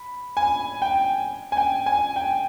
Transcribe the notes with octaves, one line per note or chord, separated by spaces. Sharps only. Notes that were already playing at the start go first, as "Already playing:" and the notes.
Already playing: B5
G#5
G5
G#5
G5
G#5
G5